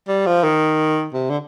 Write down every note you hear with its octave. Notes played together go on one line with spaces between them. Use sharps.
G3
F3
D#3
C3
D3